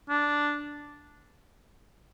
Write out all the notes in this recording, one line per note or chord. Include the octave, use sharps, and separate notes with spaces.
D4